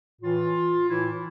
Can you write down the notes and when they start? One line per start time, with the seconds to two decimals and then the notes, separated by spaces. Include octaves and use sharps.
0.22 A2 E3 F4
0.86 A2 E3 E4